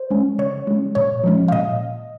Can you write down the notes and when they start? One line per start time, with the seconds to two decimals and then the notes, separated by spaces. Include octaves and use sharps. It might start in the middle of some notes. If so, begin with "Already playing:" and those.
Already playing: C5
0.10 G#3 C#4
0.38 C#3 C#5
0.67 G#3 C#4
0.95 A#2 C#5
1.24 F3 G#3 C#4
1.48 F5
1.52 A#2 D#5